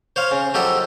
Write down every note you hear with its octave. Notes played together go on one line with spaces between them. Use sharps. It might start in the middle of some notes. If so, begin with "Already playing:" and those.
C5 C#5 F5
C#3
F3 F#3 G4 A4 D#5